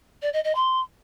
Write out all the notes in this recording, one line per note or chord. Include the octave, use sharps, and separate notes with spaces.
D5
D#5
D#5
C6